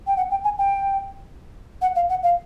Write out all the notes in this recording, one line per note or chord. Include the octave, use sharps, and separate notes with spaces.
G5
F#5
G5
G#5
G5
F#5
F5
F#5
F5